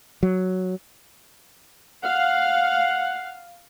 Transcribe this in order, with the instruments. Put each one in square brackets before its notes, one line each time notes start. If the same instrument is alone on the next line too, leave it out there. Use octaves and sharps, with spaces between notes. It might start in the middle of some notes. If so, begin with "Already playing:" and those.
[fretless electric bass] F#3
[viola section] F5 [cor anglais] F#5